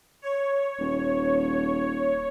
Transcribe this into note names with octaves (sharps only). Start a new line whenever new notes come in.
C#5
D#1